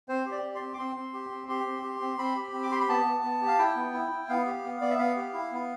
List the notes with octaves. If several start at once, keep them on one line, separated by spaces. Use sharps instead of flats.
C4 C5
G4
D5
G4
C6
C4
D6
C4 C6
C4
G4
C4
G4 C6
C4
G4
C4
C4 B5
G4
C4
D6
G4 C6
B5
B3 A5
B3
B3
G4
F5
E4 G5
B3
E4
E4
B3 F5
G4
B3
B3 D5
E5
B3 F5
G4
E4
B3